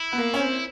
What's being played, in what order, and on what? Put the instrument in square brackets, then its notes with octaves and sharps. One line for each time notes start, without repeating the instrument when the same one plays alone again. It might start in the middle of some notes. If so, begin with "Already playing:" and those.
Already playing: [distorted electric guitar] E4
[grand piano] B3
A#3
C#4
C4